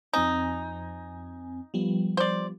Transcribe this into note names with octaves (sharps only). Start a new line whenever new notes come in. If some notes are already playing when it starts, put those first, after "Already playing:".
F2 C4 D#4 G#5
F3 G3 B3
C5 D5